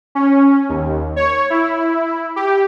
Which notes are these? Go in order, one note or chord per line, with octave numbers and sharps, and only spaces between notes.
C#4
D#2
C#5
E4
G4